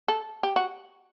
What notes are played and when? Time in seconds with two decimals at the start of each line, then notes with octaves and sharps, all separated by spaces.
0.08 A4
0.43 G4
0.56 F#4